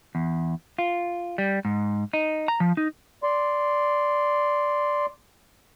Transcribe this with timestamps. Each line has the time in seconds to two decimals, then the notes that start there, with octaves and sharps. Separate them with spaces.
0.15 E2
0.78 F4
1.38 G3
1.65 G#2
2.13 D#4
2.48 A#5
2.60 F3
2.77 D#4
3.23 D5 C6